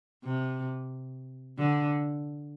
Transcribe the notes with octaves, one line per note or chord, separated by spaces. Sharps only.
C3
D3